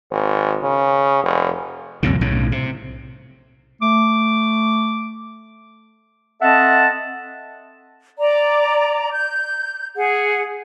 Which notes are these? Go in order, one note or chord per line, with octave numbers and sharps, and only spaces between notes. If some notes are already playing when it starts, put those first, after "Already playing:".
G#1
C#3
F1
C2 F2 A#2 C#3
B1 A2 C#3
C3
A3 D6
C4 A4 D#5 E5 F#5 A5
D5 A#5
G6
G#4 F#5